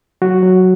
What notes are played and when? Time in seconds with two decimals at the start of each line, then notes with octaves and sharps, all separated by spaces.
0.22 F#3 F#4
0.43 F#3